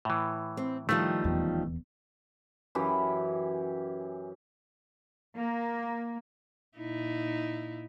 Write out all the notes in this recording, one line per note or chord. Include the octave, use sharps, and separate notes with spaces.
A2 E3
C4
A1 D#3 F3 G3 A3
D#1 E2
F#2 E3 C#4 G4
A#3
A#2 D#4 E4